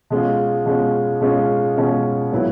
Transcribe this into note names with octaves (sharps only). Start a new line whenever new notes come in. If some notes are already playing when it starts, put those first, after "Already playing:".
B2 G#3 C#4 F4
B2 G#3 C#4 F4
B2 G#3 C#4 F4
B2 G#3 C#4 F4
A#2 F#3 B3 E4